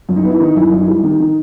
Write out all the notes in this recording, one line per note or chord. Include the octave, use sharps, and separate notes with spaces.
F#2
D#4
B3
E4
D#3 D#4
F#2 E4
F#2 D#4
E4
G3
D#4
D#3
D#3